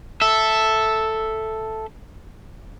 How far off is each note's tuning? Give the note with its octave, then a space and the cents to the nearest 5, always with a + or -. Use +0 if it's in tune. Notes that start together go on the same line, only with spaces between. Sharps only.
A4 +0 E5 +0